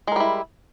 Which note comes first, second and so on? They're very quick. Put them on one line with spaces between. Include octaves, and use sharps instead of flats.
G#3 A#4 G3 E4